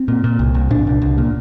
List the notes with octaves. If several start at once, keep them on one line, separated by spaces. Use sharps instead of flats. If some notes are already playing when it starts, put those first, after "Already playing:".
Already playing: C4
A#2
A#2
C2
C2
A#2 D4
C2
C2
A#2